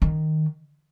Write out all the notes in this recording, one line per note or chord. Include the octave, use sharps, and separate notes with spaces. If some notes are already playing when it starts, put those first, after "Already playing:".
D#3